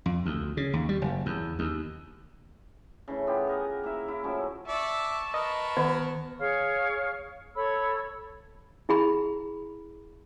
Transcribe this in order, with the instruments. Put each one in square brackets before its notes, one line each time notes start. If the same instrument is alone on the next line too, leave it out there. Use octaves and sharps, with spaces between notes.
[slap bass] F2
D2
C#3
D#2
G3
F#1
E2
D#2
[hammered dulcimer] C#3 E3 A3
B3 F4 G4
G#4 A#4 F#5
A#3 E4 E5 F5
E4
F3 F#3 A3 C#4
[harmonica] D5 E5 E6 [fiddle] A5 C#6
[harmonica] A#4 B4 [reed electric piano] D#5
[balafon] D#3 [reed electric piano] B3
[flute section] G#4 C#5 F5 F6
A4 C#5 B5 E6
[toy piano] E4 G#4 B5